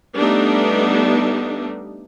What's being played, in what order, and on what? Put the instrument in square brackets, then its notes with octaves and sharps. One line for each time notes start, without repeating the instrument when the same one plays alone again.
[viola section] G3 A3 B3 D4 D#4